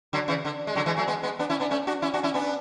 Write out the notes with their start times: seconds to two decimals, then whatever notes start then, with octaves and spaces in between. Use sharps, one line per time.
0.13 D3 F#3
0.28 C#3 E3
0.45 D3
0.67 G#3
0.75 D3 F#3
0.86 E3 G#3
0.97 F#3 A3
1.07 G#3 B3
1.23 G#3 B3
1.39 B3 D4
1.50 C#4 E4
1.60 B3 D4
1.71 A3 C#4
1.87 D4 F#4
2.02 C#4 E4
2.14 D4 F#4
2.23 C#4 E4
2.34 B3 D4